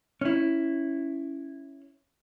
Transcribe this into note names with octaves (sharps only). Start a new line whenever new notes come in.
C#4 E4